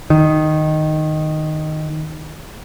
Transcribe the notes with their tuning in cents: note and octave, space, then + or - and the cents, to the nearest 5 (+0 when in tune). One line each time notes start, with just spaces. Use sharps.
D#3 -5